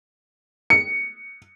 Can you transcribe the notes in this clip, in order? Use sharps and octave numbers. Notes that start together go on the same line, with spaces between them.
C#7